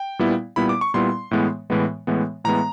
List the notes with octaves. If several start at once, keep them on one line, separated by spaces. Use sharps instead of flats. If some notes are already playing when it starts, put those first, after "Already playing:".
Already playing: G5
A#2 G3 B3 E4
A#2 G3 B3 E4 B5
D6
C#6
A#2 G3 B3 E4 C6
A2 E3 G#3 B3
A2 E3 G#3 B3
A2 E3 G#3 B3
A2 E3 G#3 B3 A#5